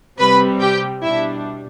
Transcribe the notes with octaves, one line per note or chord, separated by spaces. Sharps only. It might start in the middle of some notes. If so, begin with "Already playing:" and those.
C3 G3 C4 B4 B5
G4 G5
B2 G3 D4 E4 E5